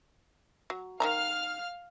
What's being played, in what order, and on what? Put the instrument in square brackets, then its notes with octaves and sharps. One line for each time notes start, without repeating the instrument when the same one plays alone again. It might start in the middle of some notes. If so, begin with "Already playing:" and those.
[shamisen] F#3
[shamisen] D#3 E3 A#5 [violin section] F5 F6